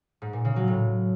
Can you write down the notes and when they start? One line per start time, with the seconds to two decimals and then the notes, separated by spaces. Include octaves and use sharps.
0.22 G#2
0.33 A#2
0.45 C#3
0.56 F#3
0.68 A2